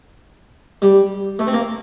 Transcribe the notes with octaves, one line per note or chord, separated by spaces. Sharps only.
G3
A3
C4
A#3